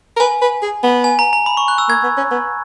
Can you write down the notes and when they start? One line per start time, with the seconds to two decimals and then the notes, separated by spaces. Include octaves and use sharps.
0.17 A#4
0.20 B4 G#5
0.42 B4
0.62 G#4
0.84 B3
1.04 G#5
1.19 A#5
1.33 A#5
1.46 B5
1.57 C#6
1.68 F#6
1.78 E6
1.89 A#3 G#6
2.03 B3
2.17 C#4
2.31 B3